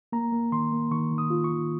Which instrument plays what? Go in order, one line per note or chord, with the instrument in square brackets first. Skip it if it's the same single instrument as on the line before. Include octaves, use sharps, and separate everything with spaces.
[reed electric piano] A#3 A#5
A#3
D#3 C6
A#3
D#3 C#6
D#3
D#6
F4
C#6
D#3